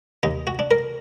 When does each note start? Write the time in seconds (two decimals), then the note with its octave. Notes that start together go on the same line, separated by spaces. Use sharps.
0.23 D#2 D#4
0.47 F#4
0.59 D4
0.71 A#4